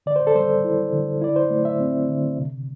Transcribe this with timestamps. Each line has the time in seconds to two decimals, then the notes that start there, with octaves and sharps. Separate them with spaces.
0.06 D3 D5
0.16 C5
0.27 A4
0.35 G3 C5
0.64 E4
0.93 D3
1.21 E4 D5
1.36 C5
1.50 A3
1.65 E5
1.80 C4
2.08 D3
2.38 C3